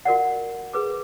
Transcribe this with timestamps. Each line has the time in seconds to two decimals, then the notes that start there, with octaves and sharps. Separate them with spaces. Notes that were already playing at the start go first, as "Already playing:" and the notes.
0.05 F#4 A#4 D5 F#5
0.73 G#4 B4 D6